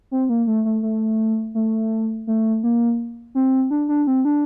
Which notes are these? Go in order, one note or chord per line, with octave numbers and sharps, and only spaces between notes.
C4
A#3
A3
A3
A3
A3
A3
A#3
C4
D4
D4
C4
D4